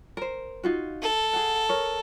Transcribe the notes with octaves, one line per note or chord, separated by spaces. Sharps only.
A#4 C5
D#4 F4 F#4
A4
G#4 F#5
A#4 C#5